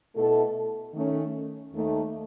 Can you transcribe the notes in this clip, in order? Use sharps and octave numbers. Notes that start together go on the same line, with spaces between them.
B2 A3 E4 A4
D#3 A3 C#4
D#2 D#3 A3